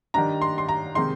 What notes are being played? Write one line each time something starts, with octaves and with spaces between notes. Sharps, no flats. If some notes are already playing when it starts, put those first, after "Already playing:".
D#3 G3 D4 A#5
C6
C6
A#5
C3 D#3 G#3 D#4 C6